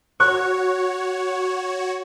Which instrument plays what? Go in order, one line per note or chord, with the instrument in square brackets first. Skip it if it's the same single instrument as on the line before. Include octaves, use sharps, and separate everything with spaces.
[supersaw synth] F#4 C#5 [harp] C#6 F#6 C#7